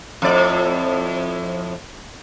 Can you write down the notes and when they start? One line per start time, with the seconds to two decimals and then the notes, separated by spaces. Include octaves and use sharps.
0.22 F2 A2 D5